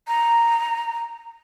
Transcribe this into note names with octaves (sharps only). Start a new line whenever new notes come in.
A#5